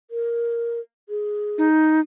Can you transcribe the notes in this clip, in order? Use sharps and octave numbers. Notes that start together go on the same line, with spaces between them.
A#4
G#4
D#4